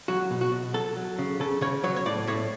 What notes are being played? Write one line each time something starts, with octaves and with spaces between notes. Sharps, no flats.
F#3 F#4
B2
F#4
B2
F#3 A4
F#3
C#3
C#3 A4
C#3 C#5
F#3 C#5
C#5
A2 D5
A2 C#5